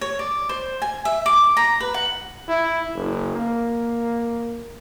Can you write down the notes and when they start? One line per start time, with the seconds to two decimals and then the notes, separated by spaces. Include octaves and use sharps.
0.01 C#5
0.19 D5
0.49 C5
0.82 G#5
1.05 E5
1.26 D6
1.57 A#5
1.80 B4
1.94 F#5
2.48 E4
2.95 F#1
3.35 A#3